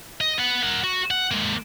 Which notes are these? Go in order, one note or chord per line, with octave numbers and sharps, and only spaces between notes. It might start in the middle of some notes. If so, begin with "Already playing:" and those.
D#5
B3 F#5
A#4 F#5
F#4
F#5
G#3 A#3